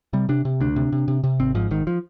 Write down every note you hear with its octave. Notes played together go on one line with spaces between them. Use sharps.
C3 G3
C3 D4
C3
D2 D4
C3
C3
C3
C3
G#1 C4
G#2 F3
G#1 D#3
F3